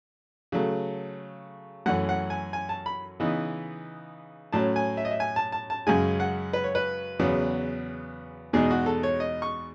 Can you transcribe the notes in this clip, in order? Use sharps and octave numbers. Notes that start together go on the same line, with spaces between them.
C#3 F#3 A3
F#2 E3 A3 C#4 F#5
F#5
G#5
G#5
A5
B5
C#3 E3 B3 D#4
A2 F#3 C#4 A5
G#5
E5
D#5
E5
G#5
A5
A5
A5
F#2 C#3 G#3 G#5
F#5
B4
C#5
B4
E2 C#3 F#3 B3
E2 B2 G#3 D#4 G#4
F#4
A4
C#5
D#5
C#6